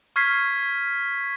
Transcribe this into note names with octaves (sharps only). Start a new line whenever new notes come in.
C#6 F6 G#6 B6 C7